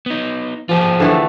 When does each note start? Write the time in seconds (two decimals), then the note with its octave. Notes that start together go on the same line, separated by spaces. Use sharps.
0.06 B3 D#4
0.69 F3 F4 G4 G#4
1.00 D3 E3 A3